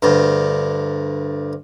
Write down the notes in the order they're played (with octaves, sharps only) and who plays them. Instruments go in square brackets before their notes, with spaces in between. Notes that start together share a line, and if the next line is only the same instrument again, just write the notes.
[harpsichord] D2 G2